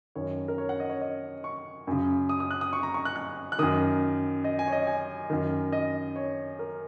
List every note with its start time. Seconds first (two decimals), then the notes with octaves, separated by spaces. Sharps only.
0.16 F#2 D#3 C#5
0.48 A#4
0.58 C#5
0.69 F#5
0.80 D#5
0.90 C#5
1.02 D#5
1.44 C#6
1.87 F#2 C#3
2.29 D#6
2.40 D#6
2.51 F#6
2.61 D#6
2.73 C#6
2.83 A#5
2.94 C#6
3.05 F#6
3.16 F#6
3.52 F#6
3.59 F#2 D#3 D#6
4.44 D#5
4.59 G#5
4.68 C#5
4.72 D#5
4.87 G#5
5.30 F#2 D#3
5.72 D#5
6.16 C#5
6.59 A#4